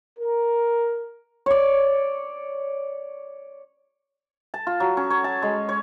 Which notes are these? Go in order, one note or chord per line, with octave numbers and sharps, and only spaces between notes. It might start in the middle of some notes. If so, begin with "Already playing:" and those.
A#4
C#5 D5
A5
F4
F#3
C#4
C#5
A5
G#3
C#5